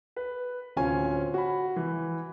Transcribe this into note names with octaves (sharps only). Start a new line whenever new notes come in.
B4
D1 C4 C#4 F4 G#5
F#4 B5
E3